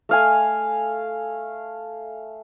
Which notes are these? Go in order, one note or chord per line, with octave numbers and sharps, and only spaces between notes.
A3 F5 G#5